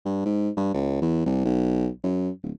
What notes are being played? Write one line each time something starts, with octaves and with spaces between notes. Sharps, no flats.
G2
G#2
G2
C#2
E2
C2
B1
F#2
D1